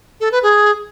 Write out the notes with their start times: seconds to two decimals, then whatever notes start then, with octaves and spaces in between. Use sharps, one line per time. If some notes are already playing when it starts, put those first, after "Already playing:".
0.21 A4
0.32 B4
0.43 G#4